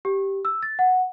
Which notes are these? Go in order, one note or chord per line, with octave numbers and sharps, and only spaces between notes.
G4
E6
A6
F#5